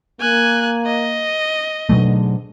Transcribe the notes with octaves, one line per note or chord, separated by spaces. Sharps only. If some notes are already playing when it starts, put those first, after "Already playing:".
A#3 G#5 F#6
D#5
G#2 B2 D3 F#3 A3